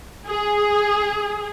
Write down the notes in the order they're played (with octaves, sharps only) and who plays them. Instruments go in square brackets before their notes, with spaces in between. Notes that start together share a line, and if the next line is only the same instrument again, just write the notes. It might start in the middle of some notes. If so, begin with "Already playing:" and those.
[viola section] G#4